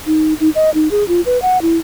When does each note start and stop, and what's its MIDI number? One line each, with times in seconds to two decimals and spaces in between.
0.07 0.34 63
0.40 0.49 63
0.55 0.70 75
0.74 0.88 63
0.91 1.06 68
1.08 1.21 65
1.26 1.40 71
1.42 1.61 78
1.62 1.78 64